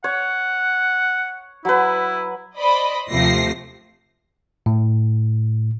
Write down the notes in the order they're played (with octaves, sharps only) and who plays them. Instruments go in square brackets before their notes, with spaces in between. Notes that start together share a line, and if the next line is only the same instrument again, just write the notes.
[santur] C#5 [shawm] F#5
[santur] F#3 B4 [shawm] E4
[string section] C5 D5 D#5 B5
D#2 C3 F3 A3 A#6 C7
[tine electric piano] A2